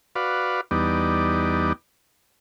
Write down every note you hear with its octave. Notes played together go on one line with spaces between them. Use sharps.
F#4 B4 D5 F5
E2 G3 B3 D#4 D5